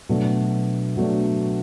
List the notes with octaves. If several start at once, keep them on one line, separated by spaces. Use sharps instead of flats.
B2 F#3 A3 D4
B2 F#3 A3 D4